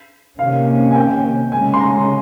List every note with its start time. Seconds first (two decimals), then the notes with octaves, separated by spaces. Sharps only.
0.39 C3 D#3 A#3 C#4 F5
0.91 G#5
0.95 G5
1.52 C#3 G#3 C#4 G#5
1.74 C6
1.80 A#5